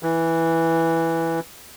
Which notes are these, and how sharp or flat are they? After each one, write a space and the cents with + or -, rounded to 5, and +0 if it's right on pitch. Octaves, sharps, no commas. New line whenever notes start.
E3 -5